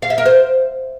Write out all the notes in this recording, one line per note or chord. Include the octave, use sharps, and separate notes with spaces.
F5
E5
A#4
C5